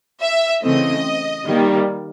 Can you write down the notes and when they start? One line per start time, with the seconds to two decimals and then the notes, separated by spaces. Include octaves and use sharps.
0.21 E5
0.62 C#3 E3 A3 C4 D#5
1.46 D#3 G3 A#3